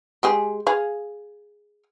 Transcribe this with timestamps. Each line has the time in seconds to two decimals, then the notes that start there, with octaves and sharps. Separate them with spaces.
0.23 G#3 G4 G#4
0.67 G#4 F5